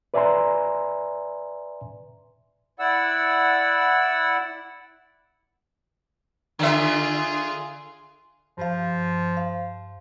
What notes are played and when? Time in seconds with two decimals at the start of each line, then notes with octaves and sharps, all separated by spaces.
0.14 B4 D5 E5 G#5 A#5 C6
2.80 E4 D5 F#5 E6
6.59 D3 F4 G#4 E5
8.58 G2 F3 F5
9.37 F5